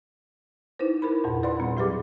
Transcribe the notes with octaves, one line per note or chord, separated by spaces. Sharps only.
D#4 E4 B4 C5
E4 A#4 B4 B5
E2 G2 A#2
B4 D5 F#5 B5 C6
A#2 G3 C4
A2 F#3 G4 G#4 B4 D6